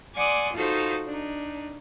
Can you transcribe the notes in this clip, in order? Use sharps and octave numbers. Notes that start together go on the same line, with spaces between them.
D5 F#5 G#5 C6 D6 D#6
D#4 F4 F#4 A4 C5 F5
D4 D#4